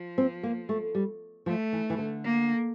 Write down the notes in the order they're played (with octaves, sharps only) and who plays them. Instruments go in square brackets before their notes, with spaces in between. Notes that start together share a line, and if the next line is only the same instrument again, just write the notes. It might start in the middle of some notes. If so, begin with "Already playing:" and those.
Already playing: [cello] F3
[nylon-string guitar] C4
A#3
A3
G3
[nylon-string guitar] F3 [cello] A3
[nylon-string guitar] E3
E3
D3
[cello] A#3